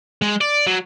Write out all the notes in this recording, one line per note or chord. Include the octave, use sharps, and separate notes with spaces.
G#3
D5
F#3